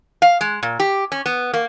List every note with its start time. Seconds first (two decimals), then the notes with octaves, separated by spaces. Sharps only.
0.22 F5
0.41 G#3
0.63 A#2
0.80 G4
1.12 C#4
1.26 B3
1.54 A#3